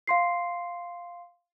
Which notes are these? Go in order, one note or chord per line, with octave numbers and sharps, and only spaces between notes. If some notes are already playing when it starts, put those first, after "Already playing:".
F5 C6 C7